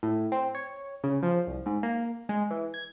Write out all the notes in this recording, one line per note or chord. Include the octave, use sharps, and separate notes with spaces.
A2
C4
C#5
C#3
F3
C2
G#2
A#3
G#3
E3
G#6